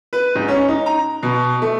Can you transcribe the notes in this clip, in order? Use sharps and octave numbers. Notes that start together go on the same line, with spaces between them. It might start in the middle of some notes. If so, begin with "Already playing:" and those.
B4
G#2
C#4
D#4
A#5
B2
A3